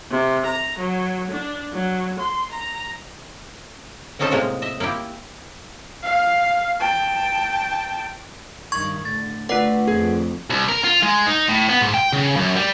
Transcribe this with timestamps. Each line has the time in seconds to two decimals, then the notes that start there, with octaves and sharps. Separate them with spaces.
0.11 C3
0.45 A#5
0.78 F#3
1.30 D4
1.72 F#3
2.19 C6
2.51 A#5
4.19 C4 C#4 D#4 F4 A4 C5
4.31 A2 C3 G#3 A#3 F4
4.62 D#5 E5
4.80 A#3 E4 F4 G4
6.03 F5
6.80 G5 A5
8.72 G2 D#3 C#6 G#6
9.05 A2 D3 A6
9.49 D3 A3 F4 B4 D5 F#5
9.87 F2 G#4
10.50 C2
10.68 A#4
10.84 F4
11.03 G#3
11.27 D#4
11.49 A2
11.69 B3
11.81 G#2
11.94 G5
12.13 C#3
12.37 F#2
12.56 G3